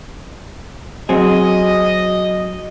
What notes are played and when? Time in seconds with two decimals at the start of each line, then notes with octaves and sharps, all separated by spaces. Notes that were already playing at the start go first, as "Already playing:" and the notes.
1.09 F#3 C4 G#4 D#5